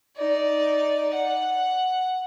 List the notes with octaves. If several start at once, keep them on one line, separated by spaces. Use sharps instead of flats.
D#4 D5
F#5